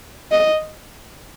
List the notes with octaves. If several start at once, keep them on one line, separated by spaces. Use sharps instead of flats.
D#5